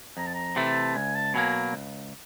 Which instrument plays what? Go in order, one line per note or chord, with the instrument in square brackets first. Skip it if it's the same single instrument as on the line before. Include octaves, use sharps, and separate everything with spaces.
[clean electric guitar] F2 [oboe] A#5
[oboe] A5
A#5
[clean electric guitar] C3 E3 A3 [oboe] A5
[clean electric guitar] C#2 [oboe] G#5
[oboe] A5
[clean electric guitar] B2 F#3 A#3 [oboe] G#5
[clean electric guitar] C#2